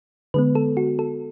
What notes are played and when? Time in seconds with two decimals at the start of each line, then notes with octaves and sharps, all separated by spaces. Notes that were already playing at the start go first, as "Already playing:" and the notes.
0.34 D3 G#3 B3 B4
0.55 A4
0.77 F#4
0.99 A4